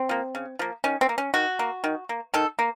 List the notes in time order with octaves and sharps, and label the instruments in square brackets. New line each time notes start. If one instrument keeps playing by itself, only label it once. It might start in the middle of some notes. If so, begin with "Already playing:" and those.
Already playing: [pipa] C4
F3 A#3
C#3
F3 A#3
D#3 C#4
C4
A#3
C#4
D#3 F#4
A#3
D#3
A#3
D#3 A4
A#3